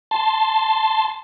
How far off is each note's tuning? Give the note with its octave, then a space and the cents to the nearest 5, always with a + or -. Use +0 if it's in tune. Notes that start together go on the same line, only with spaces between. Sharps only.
A5 +0 C6 +0